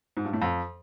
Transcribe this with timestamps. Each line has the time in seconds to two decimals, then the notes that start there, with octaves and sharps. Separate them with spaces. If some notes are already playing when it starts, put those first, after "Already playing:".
0.17 G#2
0.25 G2
0.33 A2
0.42 F2